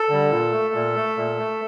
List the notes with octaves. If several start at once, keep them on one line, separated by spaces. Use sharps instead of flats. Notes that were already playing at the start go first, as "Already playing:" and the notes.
Already playing: A4
D3 G3
A#2
A3
A#2
A3
A#2
A3